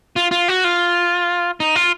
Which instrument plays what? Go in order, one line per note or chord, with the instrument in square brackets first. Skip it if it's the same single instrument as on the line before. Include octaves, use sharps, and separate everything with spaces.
[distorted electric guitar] F4
F4
F#4
F4
D#4
F4